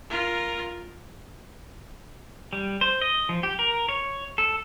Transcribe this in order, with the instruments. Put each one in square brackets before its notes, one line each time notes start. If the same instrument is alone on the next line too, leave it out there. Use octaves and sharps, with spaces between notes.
[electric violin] F4 A#4
[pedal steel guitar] G3
C5
D#5
F3
G4
A#4
C#5
A4